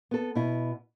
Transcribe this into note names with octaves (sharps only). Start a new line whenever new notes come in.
B3 A4
B2 E4